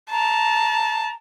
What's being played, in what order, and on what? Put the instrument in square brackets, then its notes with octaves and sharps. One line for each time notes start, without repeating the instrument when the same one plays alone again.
[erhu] A5 [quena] A#5